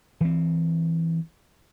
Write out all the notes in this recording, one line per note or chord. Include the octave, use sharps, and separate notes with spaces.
E3 C4